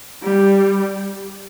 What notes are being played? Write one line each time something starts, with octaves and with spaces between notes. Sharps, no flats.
G3